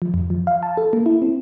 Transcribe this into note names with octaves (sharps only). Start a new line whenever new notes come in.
F3
F2
F3
F5
A5
A4
A#3
E4
C4